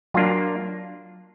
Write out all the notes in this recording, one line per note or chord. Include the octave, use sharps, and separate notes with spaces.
F#3 A#3 D4 F4